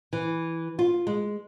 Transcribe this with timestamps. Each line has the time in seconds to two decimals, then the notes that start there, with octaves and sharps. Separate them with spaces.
0.13 E3
0.79 F4
1.07 G#3